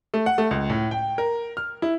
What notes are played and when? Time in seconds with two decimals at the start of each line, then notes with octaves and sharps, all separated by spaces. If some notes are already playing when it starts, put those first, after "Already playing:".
0.14 A3
0.26 F#5
0.38 A3
0.51 C#2
0.70 A2
0.91 G5
1.18 A#4
1.57 F6
1.82 E4